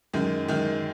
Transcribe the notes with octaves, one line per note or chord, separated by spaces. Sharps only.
F#2 D#3 G#3
F#2 D#3 G#3